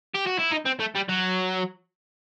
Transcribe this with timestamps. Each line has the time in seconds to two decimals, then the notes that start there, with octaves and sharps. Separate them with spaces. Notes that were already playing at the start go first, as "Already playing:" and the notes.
0.14 G4
0.26 F#4
0.39 E4
0.50 D#4
0.65 C4
0.79 A3
0.95 G3
1.09 F#3